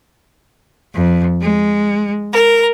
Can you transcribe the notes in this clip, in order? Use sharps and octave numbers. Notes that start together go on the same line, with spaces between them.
F2
G#3
A#4